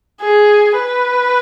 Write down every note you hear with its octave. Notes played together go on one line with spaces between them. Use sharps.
G#4
B4